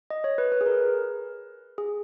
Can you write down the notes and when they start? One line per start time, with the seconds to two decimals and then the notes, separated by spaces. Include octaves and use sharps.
0.10 D#5
0.24 C#5
0.38 B4
0.52 B4
0.61 G#4
0.66 A#4
1.78 G#4